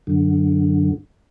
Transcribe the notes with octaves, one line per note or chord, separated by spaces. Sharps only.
F#2 D3